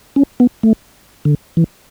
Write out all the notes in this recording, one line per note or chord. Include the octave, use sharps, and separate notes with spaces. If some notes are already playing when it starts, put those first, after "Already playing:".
C#4
B3
A3
D3
E3